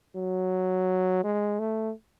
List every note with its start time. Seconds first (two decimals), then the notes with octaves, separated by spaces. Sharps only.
0.16 F#3
1.24 G#3
1.59 A3